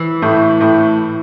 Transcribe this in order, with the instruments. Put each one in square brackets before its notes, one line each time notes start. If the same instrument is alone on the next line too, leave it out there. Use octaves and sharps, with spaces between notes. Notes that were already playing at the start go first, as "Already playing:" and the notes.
Already playing: [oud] E3
[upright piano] A2 A3
A2 A3